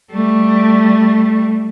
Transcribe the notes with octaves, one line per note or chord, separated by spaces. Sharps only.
G3 A3